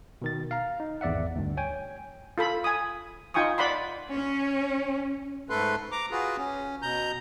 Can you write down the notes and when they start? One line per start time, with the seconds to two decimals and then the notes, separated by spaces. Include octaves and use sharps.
0.22 B2 D#3 A6
0.51 F5 A#5
0.80 D#4
1.01 G#1 E2 D5 E5 F#5
1.36 D2 G2
1.57 C#5 G5 G#5
2.38 F4 A4 B5
2.64 G#5 D#6
3.34 D#4 F4 G5 G#5 C#6 D#6
3.58 D5 F#5 B5 C6
4.13 C#4
5.50 G#2 A3 A4 B4 C6
5.92 A#5 D6
6.11 F4 F#4 G#4 B4
6.37 C#4
6.82 B2 A#5 G6